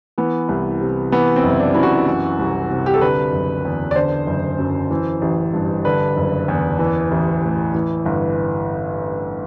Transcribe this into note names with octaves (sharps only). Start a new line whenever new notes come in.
E3 B3
C2
C3
E3 B3
C4
F#1
E4
D4
F#2 E4
F#4
E3
C2
C3
G4
A4
D3 B4
F#1
E2
D5
D3 C5
F#1
F#2
E3
A1
G2
D3 B4
F#1
E2
E3
A1
A2
E3
G1